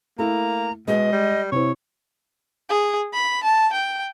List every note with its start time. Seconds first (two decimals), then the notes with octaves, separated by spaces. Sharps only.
0.19 A3 A#3 E4 A#5
0.88 B2 G#3 D#5
1.12 G3
1.52 C3 E4 C5 C#5
2.70 G#4
3.14 B5
3.43 A5
3.73 G5